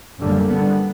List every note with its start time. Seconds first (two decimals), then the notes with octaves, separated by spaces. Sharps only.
0.19 F#2 D3 G3 A#3
0.49 D3 G3 B3